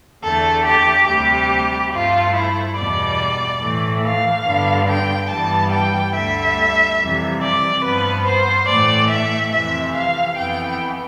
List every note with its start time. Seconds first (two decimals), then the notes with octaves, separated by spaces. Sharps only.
0.23 E2 D3 A3 A4
0.65 G4
1.08 D2 C3 G3 G4
1.92 G2 F3 A3 F4
2.34 E4
2.77 E2 B2 G3 D5
3.61 A2 E3 A3
4.03 F5
4.46 G2 D3 G3 B3
4.88 G5
5.30 G2 E3 G3 B3 A5
5.72 G5
6.15 D2 D3 G3 E5
7.00 F2 C3 E3 G3
7.42 D5
7.84 G2 F3 B3 B4
8.27 C5
8.69 A2 E3 A3 D5
9.11 E5
9.53 F2 C3 E3 E5
9.95 F5
10.38 F2 E3 B3 G5